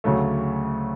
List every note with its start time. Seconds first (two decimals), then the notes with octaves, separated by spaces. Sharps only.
0.04 D2 C#3 F#3 A3